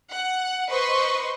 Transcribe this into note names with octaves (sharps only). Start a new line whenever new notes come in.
F#5
B4 C5 D#5 C6 C#6